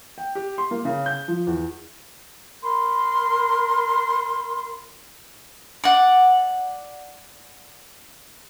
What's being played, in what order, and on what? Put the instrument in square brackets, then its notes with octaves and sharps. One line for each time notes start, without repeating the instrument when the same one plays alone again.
[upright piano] G5
G4
C6
A#3
C#3
G6
F3
E2
[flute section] A#4 B5 C6
[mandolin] D5 F#5